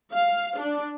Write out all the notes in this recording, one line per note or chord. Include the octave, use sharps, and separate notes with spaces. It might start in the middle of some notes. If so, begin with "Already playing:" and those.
F5
D4